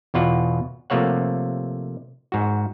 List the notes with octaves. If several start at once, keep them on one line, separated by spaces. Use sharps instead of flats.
E2 B2 F4 F#5
C3 F3 A3 A#3 C#5 F#5
G#2 F#4